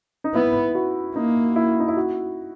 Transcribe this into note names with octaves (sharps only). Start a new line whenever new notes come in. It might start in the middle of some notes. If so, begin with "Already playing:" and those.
D#4
B3 E4
F#4
A#3 D#4
E4
D#4
E4
F#4